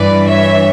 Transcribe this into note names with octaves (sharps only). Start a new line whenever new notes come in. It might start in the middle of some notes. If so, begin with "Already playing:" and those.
Already playing: G2 E3 B4 D5
C#5 E5